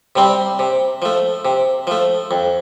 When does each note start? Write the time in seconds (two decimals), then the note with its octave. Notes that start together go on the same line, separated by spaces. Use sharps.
0.16 C3 G3 C4
0.59 C3
1.02 F3 A3
1.45 C3
1.87 F3 A3
2.31 F2